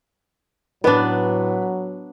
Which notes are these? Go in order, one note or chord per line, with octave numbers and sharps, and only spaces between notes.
A2 F#3 B3 D4 B4